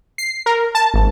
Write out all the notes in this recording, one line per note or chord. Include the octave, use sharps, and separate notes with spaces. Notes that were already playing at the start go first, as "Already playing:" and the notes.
C7
A#4
A5
G#1